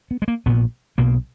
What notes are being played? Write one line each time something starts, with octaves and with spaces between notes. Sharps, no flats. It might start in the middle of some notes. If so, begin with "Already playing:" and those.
B3
G#3
A#3
A#1 A#2 B3
B1 B2 A#3